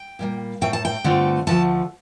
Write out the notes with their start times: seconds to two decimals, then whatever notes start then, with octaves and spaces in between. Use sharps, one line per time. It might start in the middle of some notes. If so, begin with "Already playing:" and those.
Already playing: G5
0.19 A#2 G3 A#3
0.61 A2 A3 D#4 G5
0.73 A5
0.85 G5
1.04 G2 D3 A3 C4 F4
1.47 D2 D3 F3 A3 A5